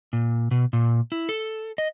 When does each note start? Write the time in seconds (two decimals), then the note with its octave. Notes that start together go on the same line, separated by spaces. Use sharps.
0.13 A#2
0.51 B2
0.73 A#2
1.12 E4
1.29 A4
1.78 D#5